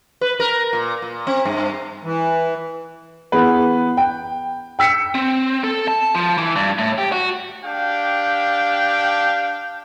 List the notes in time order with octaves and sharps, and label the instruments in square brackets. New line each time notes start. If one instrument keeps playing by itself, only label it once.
[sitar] B4
A#4
A#2
A#2
C4
G2
[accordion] E3
[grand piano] E3 B3 G#4 B4
G5
G5 E6 B6 C#7
[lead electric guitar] C4
A4
A5
F3
E3
G2
A2
G4
F#4
[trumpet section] D4 G4 F5 G5